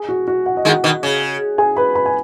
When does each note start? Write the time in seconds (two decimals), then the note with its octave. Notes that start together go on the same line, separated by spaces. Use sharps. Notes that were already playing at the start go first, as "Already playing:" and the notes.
Already playing: G#4
0.09 F#4
0.28 F#4
0.46 F#5
0.57 D#5
0.65 D#3 G#3
0.68 F#4 F#5
0.84 B2 D#3
1.03 C#3
1.58 G#4 G#5
1.77 B4 B5
1.95 B4 B5
2.06 G#5